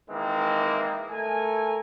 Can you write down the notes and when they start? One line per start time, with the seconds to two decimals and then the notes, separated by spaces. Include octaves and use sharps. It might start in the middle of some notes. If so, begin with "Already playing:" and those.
0.10 D#3 E3 G#3 A#3 C4
1.11 A3 A#4 G#5